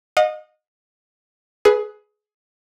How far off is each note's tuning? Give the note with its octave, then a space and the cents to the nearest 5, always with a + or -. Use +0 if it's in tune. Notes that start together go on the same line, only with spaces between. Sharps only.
D#5 -15 F#5 -45
G#4 +20 B4 +0